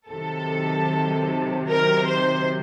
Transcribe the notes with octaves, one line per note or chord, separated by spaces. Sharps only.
C3 D#3 F#3 A4
A#4
C5